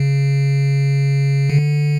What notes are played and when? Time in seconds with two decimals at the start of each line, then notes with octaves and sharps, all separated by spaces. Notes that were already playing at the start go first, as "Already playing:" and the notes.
Already playing: C#3
1.50 D3